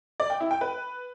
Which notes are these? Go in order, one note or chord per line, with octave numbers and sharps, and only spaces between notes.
D5
G5
E4
G5
B4